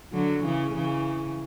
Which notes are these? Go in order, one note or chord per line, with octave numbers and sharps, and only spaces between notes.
D3 F#3
C#3 E3
C#3 E3